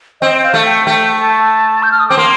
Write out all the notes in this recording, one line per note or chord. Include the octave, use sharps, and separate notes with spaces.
C4 D#5
F5
A3
G5
A3 G5
A5
G6
F6
D#6
C4 D6
A#3 C6